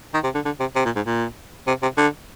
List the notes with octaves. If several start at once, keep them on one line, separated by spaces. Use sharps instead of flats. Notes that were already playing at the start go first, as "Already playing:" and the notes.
D#3
C3
D3
D3
C3
C3
A#2
G#2
A#2
C3
C3
D3